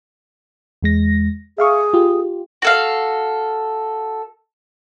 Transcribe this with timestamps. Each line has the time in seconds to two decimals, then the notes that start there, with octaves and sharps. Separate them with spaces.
0.82 E2 G#3 A#6
1.58 G#4 E5 F5 C#6
1.94 F4 G4
2.62 F#4 A4 F5